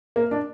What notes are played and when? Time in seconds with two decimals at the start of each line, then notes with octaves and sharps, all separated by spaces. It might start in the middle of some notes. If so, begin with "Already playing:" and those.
0.16 A#3
0.31 D4